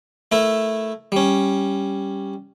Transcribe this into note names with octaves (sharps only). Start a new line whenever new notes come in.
A3 E4 A#4
G3 C#4